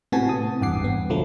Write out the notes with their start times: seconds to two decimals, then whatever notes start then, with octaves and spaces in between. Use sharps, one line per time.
0.12 A2 C3 B3 F#4 G#5 A5
0.29 D#6
0.61 G#1 E2 G2 F#5 D6 C7
0.84 B3
1.10 B1 D3 F3 F#3 A3